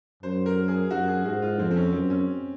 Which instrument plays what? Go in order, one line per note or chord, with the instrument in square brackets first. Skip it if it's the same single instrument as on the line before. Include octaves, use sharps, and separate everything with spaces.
[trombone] F#2 [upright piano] C5
[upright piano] A#4
G#4
[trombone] F#2 [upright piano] F#4
[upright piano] G#4
[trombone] G#2 [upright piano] F#4
[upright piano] F4
[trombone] F2 [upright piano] C4
[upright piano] C4
C#4
[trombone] F#2 [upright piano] C4
[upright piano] C#4